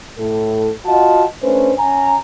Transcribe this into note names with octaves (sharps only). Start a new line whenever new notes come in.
A2 A4
F4 F#4 D#5 F#5 A5
A3 C#4 D4 B4 C5
C#4 G#5 A#5